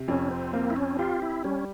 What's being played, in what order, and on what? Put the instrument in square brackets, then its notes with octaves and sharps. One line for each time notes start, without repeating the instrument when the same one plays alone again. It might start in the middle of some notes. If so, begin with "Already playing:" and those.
Already playing: [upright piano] C3
[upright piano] F2 [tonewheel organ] C#4
[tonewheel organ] C4
[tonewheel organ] A#3 [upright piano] C4
[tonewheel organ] E4
C#4
[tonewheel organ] F4 [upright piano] G4
[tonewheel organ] E4
[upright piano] G3 [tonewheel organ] C#4